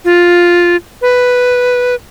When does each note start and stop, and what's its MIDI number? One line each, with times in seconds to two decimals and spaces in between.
0.05 0.76 65
1.02 1.95 71